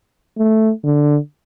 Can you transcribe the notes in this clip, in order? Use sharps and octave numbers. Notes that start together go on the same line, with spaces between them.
A3
D3